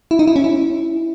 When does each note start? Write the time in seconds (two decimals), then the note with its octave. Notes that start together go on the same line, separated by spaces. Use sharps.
0.11 E4
0.19 D#4
0.27 E4
0.36 C#4
0.44 E4